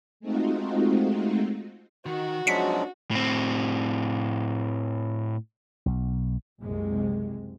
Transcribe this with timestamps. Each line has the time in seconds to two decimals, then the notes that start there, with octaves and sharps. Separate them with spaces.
0.20 G#3 A3 C4 D#4 F4 F#4
2.06 D#3 F#4
2.47 F3 F#3 G#3 C#4 D4 B6 C#7
3.11 A2 C4
5.86 B1
6.61 F#1 C2 C3 G#3